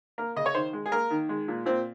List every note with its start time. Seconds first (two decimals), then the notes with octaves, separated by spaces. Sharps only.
0.18 A#3 A#4
0.36 C#3 D#5
0.46 C#5
0.55 D#3 C5
0.73 G#3
0.86 G#4
0.92 A#3 A#4
1.10 D#3
1.29 G#3
1.48 A#2
1.66 A#2 C4